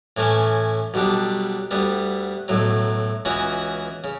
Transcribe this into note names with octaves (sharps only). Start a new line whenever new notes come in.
A2 E3 A3 C#4
B1 B2 G3 D4
D2 D3 G3 B3
B1 A2 F#3
C#2 C#3 E3 B3 F#4
C#3